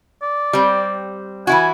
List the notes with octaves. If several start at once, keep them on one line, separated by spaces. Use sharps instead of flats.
D5
G3 C4
E3 E4 F#4 G#5